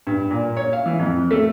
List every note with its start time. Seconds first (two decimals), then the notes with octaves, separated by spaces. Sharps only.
0.07 G2
0.31 A#2
0.57 C#5
0.73 F5
0.86 E3
0.99 F2
1.31 A3